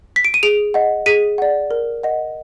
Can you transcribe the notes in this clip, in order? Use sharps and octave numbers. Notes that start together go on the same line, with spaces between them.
B6
D7
D#7
G#4 D7 F7
D#5 F#5
G#4 B6 D#7
D5 F#5
A#4
D#5 F#5